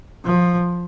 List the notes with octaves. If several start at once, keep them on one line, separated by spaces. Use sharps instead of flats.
F3